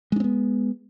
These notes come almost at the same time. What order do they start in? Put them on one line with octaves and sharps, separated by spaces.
G#3 D4 C4 B3